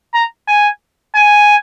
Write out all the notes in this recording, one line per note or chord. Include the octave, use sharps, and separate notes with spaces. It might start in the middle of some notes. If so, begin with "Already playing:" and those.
A#5
G#5
G#5